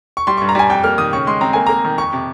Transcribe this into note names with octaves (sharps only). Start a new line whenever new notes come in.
C#6
G3 C6
G2 C#6
A#5
G3 G#5
F2 G5
A#3 F6
D#3 D#6
C#3 C#6
G#3 C6
C4 A#5
A#3 G#5
A#3 A#5
D#3
F2 C#6
C3